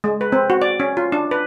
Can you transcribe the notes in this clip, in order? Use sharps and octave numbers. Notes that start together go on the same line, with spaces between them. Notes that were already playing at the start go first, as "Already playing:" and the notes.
G#3
B4
C4
F#4
D5
C#4
F4
D4
B4